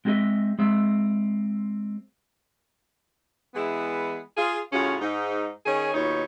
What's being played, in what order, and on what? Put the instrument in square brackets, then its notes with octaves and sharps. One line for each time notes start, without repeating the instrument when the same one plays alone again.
[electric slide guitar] G#3 C4 E4 G4 D#5 E5
G#3 C4 E5
[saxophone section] E3 G#3 B3 E4 G#4
F4 G#4
A2 C#3 C#4 F4 F#4
G#2 D#4
D#3 C#4 G#4 C#5
D#2 B2 D#4 F4 C#5